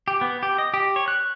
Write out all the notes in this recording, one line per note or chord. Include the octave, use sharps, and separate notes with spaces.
G4
B3
G4
D#5
G4
C#5
F#6